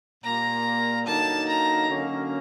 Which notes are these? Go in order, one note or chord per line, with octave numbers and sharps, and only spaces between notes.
A#2 G3 A#3 A#5
D3 F#3 A#3 D#4 A5
A#5
D3 F#3 A#3 C#4